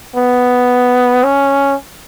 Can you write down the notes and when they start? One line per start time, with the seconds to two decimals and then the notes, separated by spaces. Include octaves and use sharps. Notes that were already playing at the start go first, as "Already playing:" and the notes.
0.16 B3
1.24 C#4